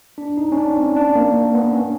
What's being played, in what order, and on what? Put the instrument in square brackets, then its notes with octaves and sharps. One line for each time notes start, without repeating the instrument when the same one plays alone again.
[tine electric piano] D4
D#4
C#4
D4
C4
D4
A#3
B3
C#4